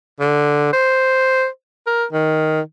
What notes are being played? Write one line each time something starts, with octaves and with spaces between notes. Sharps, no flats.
D3
C5
A#4
D#3